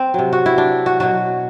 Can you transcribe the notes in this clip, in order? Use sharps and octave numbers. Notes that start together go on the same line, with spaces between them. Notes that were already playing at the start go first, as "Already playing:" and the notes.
Already playing: C4
C3 F#3
F#4
E4
D4
F#4
B2 F#3 F#4